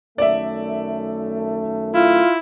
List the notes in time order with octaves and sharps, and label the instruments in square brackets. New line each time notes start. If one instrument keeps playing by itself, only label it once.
[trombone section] F#2 D#3 A3 [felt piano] D5 E5
[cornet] E4 [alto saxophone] F4